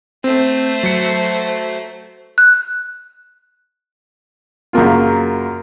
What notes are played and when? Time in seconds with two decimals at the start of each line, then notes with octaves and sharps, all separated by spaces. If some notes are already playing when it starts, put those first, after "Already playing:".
0.24 A3 C4 C5
0.83 F#3 C#7
2.38 F#6
4.73 F#2 C#3 A#3 F4